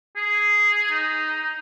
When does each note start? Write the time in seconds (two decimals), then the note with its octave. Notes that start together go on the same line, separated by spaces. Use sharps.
0.16 G#4
0.91 D#4